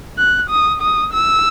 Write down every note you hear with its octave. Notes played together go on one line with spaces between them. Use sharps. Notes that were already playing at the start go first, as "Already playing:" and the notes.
F#6
D#6
D#6
E6